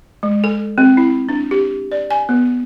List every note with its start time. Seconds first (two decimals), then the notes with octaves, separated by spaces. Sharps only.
0.23 G#3
0.44 A4
0.78 C4
0.97 E4
1.29 D4
1.51 G4
1.92 D5
2.11 G#5
2.29 B3